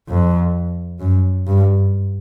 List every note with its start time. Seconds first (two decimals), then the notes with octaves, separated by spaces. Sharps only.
0.09 F2
1.00 F#2
1.47 G2